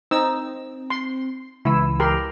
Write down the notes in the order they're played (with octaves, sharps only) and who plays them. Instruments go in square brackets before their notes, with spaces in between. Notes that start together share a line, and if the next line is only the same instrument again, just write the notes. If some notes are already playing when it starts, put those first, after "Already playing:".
[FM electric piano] C4 [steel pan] D#4 E6
[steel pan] C6
[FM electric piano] C#2 E3 E6 [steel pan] E4
[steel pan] G4 A#4 C6